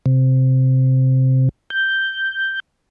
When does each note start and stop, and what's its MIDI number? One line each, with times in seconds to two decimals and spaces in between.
0.06 1.49 48
1.70 2.60 91